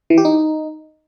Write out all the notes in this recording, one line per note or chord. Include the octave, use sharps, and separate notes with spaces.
E3
G4
D#4